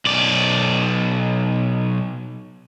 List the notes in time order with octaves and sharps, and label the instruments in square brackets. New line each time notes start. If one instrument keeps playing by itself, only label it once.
[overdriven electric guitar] B1 D5